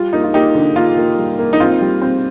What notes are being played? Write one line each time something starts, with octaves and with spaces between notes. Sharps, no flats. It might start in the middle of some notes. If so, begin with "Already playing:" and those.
Already playing: G3 F4
A#3 D#4
F4
A#3 D#4 G4
D3
A#3 F4
A#3
G3
A#3
D#4
C4 F4
G3
C4